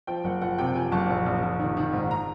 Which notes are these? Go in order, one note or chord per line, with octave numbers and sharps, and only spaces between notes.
F3 G5
F#1 F#5
F3 F#5
C3 G5
F3 G#5
F#1 A5
A#1
A#1
A#1
D#3
D#3
G#2
A#5